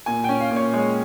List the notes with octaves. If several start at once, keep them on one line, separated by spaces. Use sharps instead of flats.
A#2 G#5
C#4 G5
F5
A#2
C#5
G#3